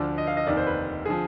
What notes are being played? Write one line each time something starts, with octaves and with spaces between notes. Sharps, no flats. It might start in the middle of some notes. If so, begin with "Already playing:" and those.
Already playing: D2 D3 F3 D5
D#5
F5
D#5
F1 D#2 D#3 D5
C5
B4
D3 F3 G#4